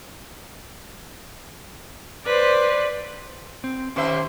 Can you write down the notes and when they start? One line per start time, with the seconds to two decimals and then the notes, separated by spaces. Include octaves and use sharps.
2.26 B4 C5 D5
3.64 C4
3.96 D#2 C#4 G4 C5 E5